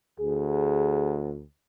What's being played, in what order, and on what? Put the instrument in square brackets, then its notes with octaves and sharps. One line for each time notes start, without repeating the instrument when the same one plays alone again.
[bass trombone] D2 [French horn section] G#4